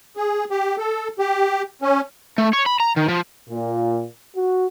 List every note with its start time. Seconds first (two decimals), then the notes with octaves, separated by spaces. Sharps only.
0.17 G#4
0.51 G4
0.78 A4
1.19 G4
1.82 C#4
2.38 A3
2.53 C#5
2.66 B5
2.80 A#5
2.97 D#3
3.09 F3
3.50 A#2
4.36 F#4